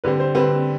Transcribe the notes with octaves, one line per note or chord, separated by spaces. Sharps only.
D3 G3 C4 B4
C5
D3 G3 C4 B4